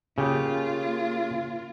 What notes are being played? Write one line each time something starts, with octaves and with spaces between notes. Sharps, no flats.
C#3 A#3 F4 G4